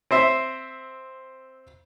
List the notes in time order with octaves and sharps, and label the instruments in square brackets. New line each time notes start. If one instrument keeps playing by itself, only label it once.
[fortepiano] C4 C5 E5